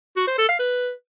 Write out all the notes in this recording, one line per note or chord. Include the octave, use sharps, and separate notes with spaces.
F#4
C5
A4
F5
B4